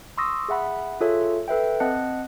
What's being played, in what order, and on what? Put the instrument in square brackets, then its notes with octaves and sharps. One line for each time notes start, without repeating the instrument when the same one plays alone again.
[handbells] C6 C#6 D#6 E6 A#6
G#4 E5 F#5 B5
F4 G#4 A4 C#5 E5
A4 B4 E5 G5
C4 D#5 F#5 A5 F#6 C#7